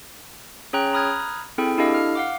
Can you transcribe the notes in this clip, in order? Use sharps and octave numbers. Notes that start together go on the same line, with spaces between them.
C#4 G#4 C#5 G5 A#5 F#6
A#5 B5 D#6 F6 F#6 G#6
C4 E4 G#4 A4 G5
D4 E4 G4 A4 D#5 F5
F6
F5 F#5 D6